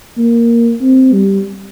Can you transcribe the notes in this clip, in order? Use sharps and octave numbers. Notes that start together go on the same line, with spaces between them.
A#3
C4
G3